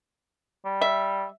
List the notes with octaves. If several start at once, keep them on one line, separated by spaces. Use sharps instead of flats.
G3
E5